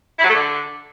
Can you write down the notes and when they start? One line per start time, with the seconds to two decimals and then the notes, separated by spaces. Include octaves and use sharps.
0.19 E4
0.24 F#3
0.29 A3
0.34 D3